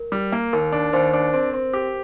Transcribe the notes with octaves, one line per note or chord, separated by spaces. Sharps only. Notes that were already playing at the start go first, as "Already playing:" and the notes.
Already playing: A#4
G3
A#3
D#2 A#4
D4
D#2 C5
D4
C4
C4
G4